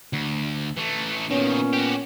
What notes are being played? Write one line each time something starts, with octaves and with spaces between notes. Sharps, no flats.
D2
E3 A3
A#2 D#3 F3 B3 C#4
F#4 G4